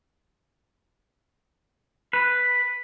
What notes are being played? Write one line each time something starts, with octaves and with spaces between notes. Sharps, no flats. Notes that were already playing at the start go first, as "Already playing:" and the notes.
B4